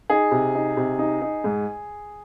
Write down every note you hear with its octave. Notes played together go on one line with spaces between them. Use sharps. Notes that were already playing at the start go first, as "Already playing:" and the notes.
D#4 G#4
C3
D#4
C3
D#4
D#4
G#2